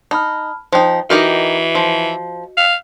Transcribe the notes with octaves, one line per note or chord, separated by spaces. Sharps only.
D#4 A5 B5 F6
F3 D#4 C5 G5
E3 D#4 F#4 G4 A#4 D#5 C#7
F3
F5